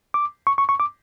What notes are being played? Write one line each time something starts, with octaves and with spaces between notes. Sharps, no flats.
D6
C#6
C#6
C#6
D6